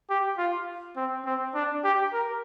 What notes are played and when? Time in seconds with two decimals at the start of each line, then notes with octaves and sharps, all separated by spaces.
0.10 G4
0.38 F4
0.97 C4
1.25 C4
1.55 D4
1.84 G4
2.13 A#4